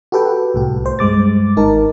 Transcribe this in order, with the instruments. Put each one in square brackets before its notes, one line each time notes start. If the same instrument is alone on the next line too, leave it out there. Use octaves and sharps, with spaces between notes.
[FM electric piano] F#4 G4 A4 B4 G5
C2 A2 G4
C5
G2 G#3 D6 A6
G#1 D#4 A#4 A5